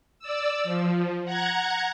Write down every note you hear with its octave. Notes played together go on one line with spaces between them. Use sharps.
D5 E6
F3
F#5 A#5 F#6 G#6